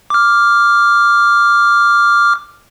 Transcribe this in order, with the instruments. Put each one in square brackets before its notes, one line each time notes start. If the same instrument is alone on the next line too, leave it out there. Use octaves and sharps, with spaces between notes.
[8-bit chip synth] D6 F6